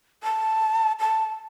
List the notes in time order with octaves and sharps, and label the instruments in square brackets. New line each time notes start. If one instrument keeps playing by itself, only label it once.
[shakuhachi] A5
A5